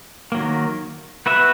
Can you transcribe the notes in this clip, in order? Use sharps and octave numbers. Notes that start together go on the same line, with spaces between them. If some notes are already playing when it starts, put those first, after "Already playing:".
D#3 F#3 A#3
B3 F#4 B4 E5